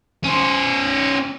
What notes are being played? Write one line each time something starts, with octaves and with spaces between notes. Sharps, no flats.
C#4 C5